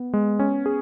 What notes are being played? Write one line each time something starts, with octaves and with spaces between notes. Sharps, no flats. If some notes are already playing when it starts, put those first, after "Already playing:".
Already playing: B3
G#3
C#4
G#4